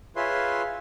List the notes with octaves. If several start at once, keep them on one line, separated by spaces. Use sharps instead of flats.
F4 G#4 B4 C#5 E5 C6